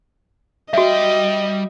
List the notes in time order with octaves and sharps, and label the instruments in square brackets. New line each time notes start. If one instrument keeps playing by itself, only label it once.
[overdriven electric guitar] G3 G5 [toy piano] F#4 E5 [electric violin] D#5